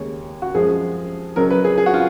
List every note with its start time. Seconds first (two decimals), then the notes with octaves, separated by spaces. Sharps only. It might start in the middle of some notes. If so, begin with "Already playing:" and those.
Already playing: D#2 C#3 G#3 C#5
0.42 F#4
0.54 F#2 F3 G#3 G#4
1.36 C#2 C#3 F#3 A#4
1.50 B4
1.64 G#4
1.78 G#4
1.86 F#4
1.94 F4